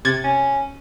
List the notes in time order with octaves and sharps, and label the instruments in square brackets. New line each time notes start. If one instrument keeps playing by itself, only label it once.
[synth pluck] C3 G#6 A6
[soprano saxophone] C#4